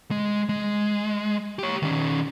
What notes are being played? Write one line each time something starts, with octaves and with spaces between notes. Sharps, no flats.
G#3
G#3
G4 C#5
D#3 C#4